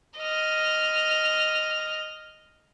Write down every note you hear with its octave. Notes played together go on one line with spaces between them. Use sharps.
D#5 F6